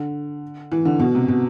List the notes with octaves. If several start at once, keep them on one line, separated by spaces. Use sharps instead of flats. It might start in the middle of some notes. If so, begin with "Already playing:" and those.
Already playing: D3
E3
D3
B2
C3
B2